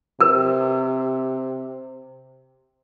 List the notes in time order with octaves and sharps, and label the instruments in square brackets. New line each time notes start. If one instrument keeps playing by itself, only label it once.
[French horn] C3 [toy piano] A#4 B4